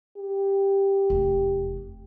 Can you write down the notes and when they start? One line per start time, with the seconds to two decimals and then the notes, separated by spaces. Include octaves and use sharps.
0.17 G4
1.10 F1 E2